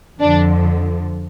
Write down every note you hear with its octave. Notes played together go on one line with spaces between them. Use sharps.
F2 D3 F3 D4